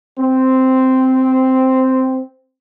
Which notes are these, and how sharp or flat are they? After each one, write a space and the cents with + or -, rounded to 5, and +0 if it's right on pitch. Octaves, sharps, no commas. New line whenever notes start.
C4 -5